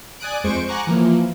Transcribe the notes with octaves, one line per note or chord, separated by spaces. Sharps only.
D5 G#5 D#6 F#6 D7
F2 G#3 C5 C#6 D7
F#5 G#5 A#5 C#6 D6 F#6
E3 F3 A#3